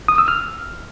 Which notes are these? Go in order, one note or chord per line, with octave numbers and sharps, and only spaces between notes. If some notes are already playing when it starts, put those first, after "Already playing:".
D#6
E6
F6